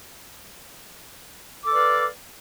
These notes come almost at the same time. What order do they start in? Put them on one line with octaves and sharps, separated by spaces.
D6 A4 D5 B4 F5